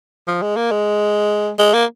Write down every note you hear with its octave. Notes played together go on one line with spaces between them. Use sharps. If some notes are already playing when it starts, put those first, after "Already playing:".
F3
G#3
A#3
G#3
G#3
A#3